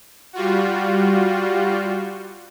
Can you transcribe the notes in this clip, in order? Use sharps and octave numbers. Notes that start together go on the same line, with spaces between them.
G3 F4 F#4